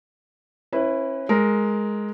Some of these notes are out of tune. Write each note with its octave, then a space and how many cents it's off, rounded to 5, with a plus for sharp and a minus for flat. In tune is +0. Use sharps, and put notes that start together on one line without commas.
C#4 -40 E4 +0 B4 +0
G#3 +5 A#4 +0